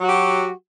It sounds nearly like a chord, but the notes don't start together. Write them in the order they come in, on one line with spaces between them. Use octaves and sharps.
F#3 F#4 G4